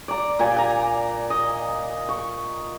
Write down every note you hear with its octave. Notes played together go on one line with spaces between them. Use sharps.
D5 A#5
A#2 G4 G#5
G#5 A#5
D#5
C#6